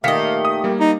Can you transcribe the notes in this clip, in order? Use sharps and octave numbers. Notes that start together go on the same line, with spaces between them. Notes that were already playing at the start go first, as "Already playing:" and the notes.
A#2 D#3 A3 G4 D#5 F5 B6 C#7
D#6
G3 A#3
D#4 B5